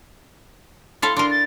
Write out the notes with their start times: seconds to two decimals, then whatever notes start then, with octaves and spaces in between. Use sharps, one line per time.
1.02 E4 A4 F5 C6
1.17 D4 A#4 C6
1.30 A6